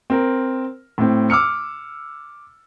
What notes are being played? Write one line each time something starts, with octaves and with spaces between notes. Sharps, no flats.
C4 A#4
A2 C4
D6 E6 F6 C#7